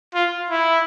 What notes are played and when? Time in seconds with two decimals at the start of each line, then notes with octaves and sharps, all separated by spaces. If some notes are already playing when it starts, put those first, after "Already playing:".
0.14 F4
0.50 E4